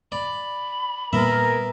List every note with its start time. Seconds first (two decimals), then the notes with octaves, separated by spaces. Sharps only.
0.12 D5 B5
1.13 A#2 G3 A#3 B3 G#4 A#4 E5